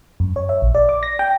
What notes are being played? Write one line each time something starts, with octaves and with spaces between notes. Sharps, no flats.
F#2
C#5
E5
A#1
D5
D6
A#6
G5